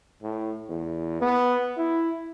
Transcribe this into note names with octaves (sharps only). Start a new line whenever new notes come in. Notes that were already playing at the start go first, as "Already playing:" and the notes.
A2
E2
B3
E4